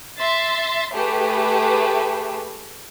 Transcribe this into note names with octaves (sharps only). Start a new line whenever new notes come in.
E5 C6 A6
A3 G4 G#4 B4